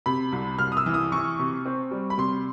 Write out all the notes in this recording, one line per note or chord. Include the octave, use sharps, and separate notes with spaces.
C3 B5
C2
C2 F6
D#6
E6
E3
D#6
E3 C#6
C3
C4
G3
B5
C3 C6